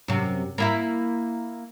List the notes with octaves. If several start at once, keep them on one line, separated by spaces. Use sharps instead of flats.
F#2 C3
A#3 E4 E5